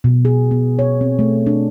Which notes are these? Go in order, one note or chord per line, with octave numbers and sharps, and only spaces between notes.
B2
G#4
B3
C#5
C4
A3
D4